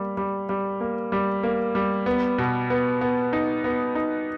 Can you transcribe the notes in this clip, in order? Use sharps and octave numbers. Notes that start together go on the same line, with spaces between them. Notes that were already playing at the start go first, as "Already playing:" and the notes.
Already playing: G3 A#3
G3
G3
A#3
G3
A#3
G3
B3
B2
B3
B3
D#4
B3
D#4